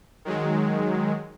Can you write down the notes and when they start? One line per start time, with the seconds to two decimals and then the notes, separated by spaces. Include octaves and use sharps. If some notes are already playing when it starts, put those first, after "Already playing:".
0.25 D#3 F#3 G#3